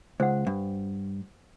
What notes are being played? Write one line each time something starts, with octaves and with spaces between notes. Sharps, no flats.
C#2 C5 F#5
G2